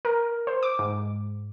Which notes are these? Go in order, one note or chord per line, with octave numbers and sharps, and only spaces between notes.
A#4
C5
D6
G#2